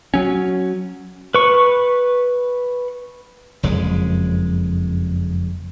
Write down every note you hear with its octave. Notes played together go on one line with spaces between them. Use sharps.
F#3 C#4
B4 C#6
F#1 F2 G#3